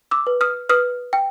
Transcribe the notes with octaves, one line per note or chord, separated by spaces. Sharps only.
D6 E6
B4
D#6 F6
B4 D#6 F6
G5